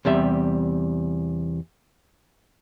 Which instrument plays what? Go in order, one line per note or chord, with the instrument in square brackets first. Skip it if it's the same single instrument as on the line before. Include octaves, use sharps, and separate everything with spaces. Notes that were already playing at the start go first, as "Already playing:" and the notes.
[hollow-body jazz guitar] E2 C3 G3 E5